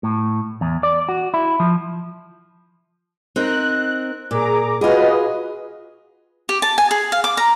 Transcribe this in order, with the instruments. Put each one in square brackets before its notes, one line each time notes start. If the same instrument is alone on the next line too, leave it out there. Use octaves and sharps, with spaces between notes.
[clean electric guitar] A2
E2
D5
F#4
E4
F3
[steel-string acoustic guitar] C4 D#4 A#4 [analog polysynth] F#6
[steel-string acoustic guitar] A#2 [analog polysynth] G#4 A#5 D6
[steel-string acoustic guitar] F4 G#4 [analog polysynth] F#4 B4 D#5
[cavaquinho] G4
A5
G#5
G#4
F5
D6
A#5